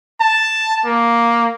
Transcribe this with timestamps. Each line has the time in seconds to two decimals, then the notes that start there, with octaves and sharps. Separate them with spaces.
0.21 A5
0.85 A#3